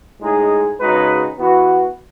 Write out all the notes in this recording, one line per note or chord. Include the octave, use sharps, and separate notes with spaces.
A2 G#3 D#4 G#4
C#3 G#3 D#4 F#4 B4
E3 B3 F#4 B4